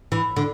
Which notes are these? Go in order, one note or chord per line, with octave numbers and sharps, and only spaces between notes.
E3
D3